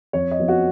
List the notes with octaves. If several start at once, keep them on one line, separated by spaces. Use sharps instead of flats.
F2 C#5
D#5
F3 B3
F#4